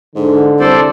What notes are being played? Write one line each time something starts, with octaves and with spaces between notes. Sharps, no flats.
G#2 D3
C2 A4 C5 D5